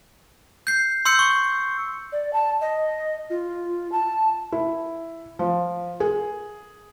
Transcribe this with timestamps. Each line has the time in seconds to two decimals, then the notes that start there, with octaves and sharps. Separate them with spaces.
0.67 G6 C7
1.05 C6 E6 G6 C#7
1.19 C#6
2.13 D5
2.33 A5
2.61 D#5
3.30 F4
3.92 A5
4.52 E4
5.39 F3
6.00 G#4